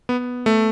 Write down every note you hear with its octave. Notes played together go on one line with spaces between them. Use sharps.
B3
A3